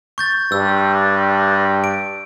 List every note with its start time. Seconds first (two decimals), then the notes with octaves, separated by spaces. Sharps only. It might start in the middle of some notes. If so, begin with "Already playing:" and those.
0.18 C#6 G6 A6
0.52 G2 E6
1.84 D7